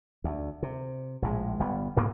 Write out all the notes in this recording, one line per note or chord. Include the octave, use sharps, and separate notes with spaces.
D2
C3
A#1 A2 G#3
G1 G3 B3
B1 G#2 A#3 B3